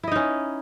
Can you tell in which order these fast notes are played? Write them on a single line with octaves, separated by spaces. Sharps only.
E4 D#5 D#4 C#4